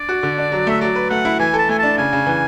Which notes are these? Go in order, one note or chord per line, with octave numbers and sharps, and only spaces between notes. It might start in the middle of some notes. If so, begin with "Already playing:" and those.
Already playing: D4 D5
F#4
D3
D4
F#3
A3 E5
F#3 D5
B4
A3 F#5
E4
E3 G#5
A4
A5
A3 G#5
D4 A5
C#3 G#5
C#3
E3